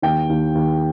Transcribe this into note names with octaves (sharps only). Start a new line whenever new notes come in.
D#2 G5
D#2
D#2